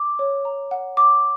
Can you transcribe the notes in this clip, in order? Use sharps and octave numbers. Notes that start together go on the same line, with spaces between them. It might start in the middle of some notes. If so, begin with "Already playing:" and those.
Already playing: D6
C#5
A#5
F#5
D6